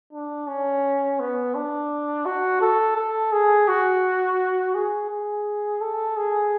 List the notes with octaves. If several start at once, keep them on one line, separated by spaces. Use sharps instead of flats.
D4
C#4
B3
D4
F#4
A4
A4
G#4
F#4
G#4
G#4
A4
G#4